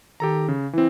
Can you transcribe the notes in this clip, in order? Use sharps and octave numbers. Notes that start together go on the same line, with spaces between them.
D#3 G4 A4 A#5
C#3
E3 C4 E4